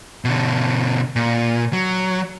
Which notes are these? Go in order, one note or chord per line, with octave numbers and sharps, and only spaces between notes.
B2 D3
A#2
F#3